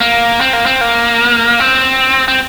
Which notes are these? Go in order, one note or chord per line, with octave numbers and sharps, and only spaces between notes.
A#3
C4
A#3
C4
A#3
C4
C4